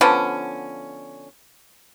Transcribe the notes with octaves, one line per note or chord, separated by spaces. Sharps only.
D3 F3 B3 C#4